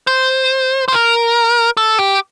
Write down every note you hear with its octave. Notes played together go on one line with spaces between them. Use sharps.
C5
C5
A#4
A4
G4